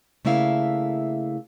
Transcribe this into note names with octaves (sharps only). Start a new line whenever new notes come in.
C#3 A3 A#3 E4 E5 F5